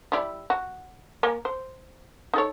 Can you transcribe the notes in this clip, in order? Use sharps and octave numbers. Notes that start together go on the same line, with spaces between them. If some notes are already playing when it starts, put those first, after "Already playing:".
G3 E4 D5
F#4
A#3 G#5
C5
D#4 A4 C#5